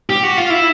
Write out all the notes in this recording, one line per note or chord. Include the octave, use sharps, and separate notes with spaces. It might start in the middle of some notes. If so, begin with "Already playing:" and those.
G4
F#4
F4
E4